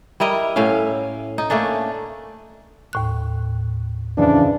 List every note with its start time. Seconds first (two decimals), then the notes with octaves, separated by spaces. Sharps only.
0.20 G3 E4 A#4 D#5
0.56 A2 C#4 E5 F5
1.38 D#4
1.50 A3 A#3 C#4 D4
2.93 D#2 A2 F#6
4.17 F2 C#3 E3 D4